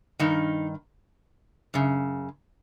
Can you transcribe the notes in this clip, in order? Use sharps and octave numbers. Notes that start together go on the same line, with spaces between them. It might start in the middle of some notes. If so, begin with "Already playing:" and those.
G2 D#3 D#4
F#2 C#3